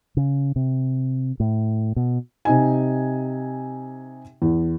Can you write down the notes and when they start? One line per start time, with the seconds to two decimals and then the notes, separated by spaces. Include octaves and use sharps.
0.17 C#3
0.56 C3
1.40 A2
1.96 B2
2.45 C3 D#4 G#5
4.42 E2